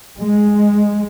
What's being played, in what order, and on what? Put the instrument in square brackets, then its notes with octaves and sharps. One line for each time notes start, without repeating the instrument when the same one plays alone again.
[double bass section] G#3